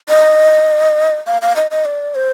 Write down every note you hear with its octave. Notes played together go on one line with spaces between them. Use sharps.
D#5
F5
F5
D#5
D#5
D5
C5